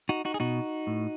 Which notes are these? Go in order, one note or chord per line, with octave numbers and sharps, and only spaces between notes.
D#4 F#4
D#4 F#4
G#4
B2 D#4 F#4
A2